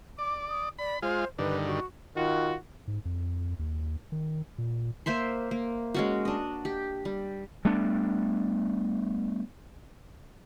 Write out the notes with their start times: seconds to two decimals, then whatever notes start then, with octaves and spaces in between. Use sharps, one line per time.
0.18 D5 D6
0.49 D#6
0.79 D5 B5
1.02 G#3 F4 C5
1.39 G2 D3 D#3 B4
1.66 F#4
2.16 D#3 F4 F#4
2.88 G#2
3.05 F2
3.59 D#2
4.12 D#3
4.58 A#2
5.06 A#3 C5 E5 C6
5.51 A#3
5.94 G#3 C#4 F#4
6.25 D4 D#5
6.65 G4
7.05 G3
7.65 G3 A3 B3 D4